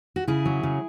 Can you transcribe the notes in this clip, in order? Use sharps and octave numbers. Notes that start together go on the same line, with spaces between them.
F#4
C#3 E4 G#4
F#3
C#3